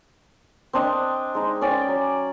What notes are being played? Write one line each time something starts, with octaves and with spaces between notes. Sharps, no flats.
C4 D4 D#5
G#3 D#4
C#4 D5 G5
F#3